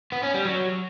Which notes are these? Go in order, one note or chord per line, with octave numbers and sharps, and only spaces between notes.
B3
C#4
G3
F#3